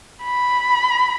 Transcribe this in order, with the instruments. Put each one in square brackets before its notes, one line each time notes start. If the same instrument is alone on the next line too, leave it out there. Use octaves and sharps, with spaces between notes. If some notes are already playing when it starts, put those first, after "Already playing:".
[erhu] B5